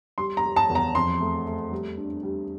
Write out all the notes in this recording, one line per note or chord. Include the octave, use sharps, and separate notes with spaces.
G3 C6
A#5
G3
A5
E2
A#5
F2 C6
A3
A3
G3
D4
G3